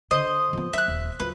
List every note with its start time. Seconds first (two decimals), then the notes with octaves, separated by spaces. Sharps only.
0.11 D3 C5 D#5
0.53 F3 B3
0.73 F#3 E5 F#6
0.88 D#1
1.20 F#3 F4 B4